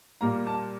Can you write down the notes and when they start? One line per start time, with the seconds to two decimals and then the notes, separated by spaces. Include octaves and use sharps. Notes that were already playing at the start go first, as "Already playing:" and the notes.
0.21 A#2 G3 A#3 A#5
0.47 A5